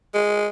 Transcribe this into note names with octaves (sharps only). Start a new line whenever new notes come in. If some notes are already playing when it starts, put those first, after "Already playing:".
G#3